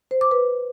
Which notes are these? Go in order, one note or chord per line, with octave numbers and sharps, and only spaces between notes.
C5
D6
B4